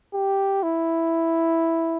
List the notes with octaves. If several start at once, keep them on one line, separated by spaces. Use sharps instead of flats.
G4
E4